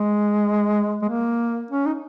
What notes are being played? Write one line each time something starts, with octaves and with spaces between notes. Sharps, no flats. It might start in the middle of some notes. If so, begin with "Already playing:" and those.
Already playing: G#3
G#3
A#3
C#4
D#4